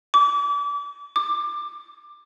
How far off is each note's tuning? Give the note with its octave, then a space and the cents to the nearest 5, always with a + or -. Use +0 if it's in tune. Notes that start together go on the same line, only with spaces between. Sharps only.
D6 -35
D6 +20